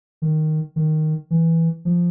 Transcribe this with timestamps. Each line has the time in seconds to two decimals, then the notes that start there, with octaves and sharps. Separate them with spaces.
0.22 D#3
0.76 D#3
1.30 E3
1.85 F3